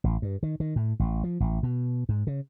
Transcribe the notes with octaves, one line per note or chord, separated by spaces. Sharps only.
A1
G2
D#3
D#3
A2
A1
F3
A1
B2
G#2
C#3